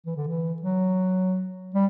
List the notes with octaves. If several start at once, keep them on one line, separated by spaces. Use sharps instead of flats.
E3
D3
E3
F#3
G3